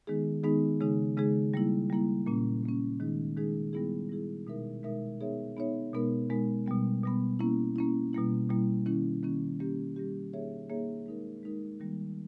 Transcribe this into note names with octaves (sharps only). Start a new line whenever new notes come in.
D#3 G#3 B3 D#4 G#4
D#3 G#3 B3 D#4 G#4
C#3 G#3 D#4 G#4
C#3 G#3 D#4 G#4
G3 A#3 E4
G3 A#3 E4
A#2 A#3 C#4
A#2 A#3 C#4
D#3 G#3 D#4 G#4
D#3 G#3 D#4 G#4
G3 B3 E4 G#4
G3 B3 E4 G#4
B2 G#3 D#4 A#4 E5
B2 G#3 D#4 A#4 E5
B3 D#4 G#4 C#5 E5
B3 D#4 G#4 C#5 E5
B2 G#3 B3 D#4 A#4
B2 G#3 B3 D#4 A#4
B2 G3 B3
B2 G3 B3
A#3 C#4 E4
A#3 C#4 E4
B2 G3 A#3 E4
B2 G3 A#3 E4
D#3 A#3 C#4 E4
D#3 A#3 C#4 E4
G3 A#3 C#4 G4
G3 A#3 C#4 G4
A#3 D#4 G#4 C#5 E5
A#3 D#4 G#4 C#5 E5
G#3 D#4 A#4
G#3 D#4 A#4
D#3 G3 A#3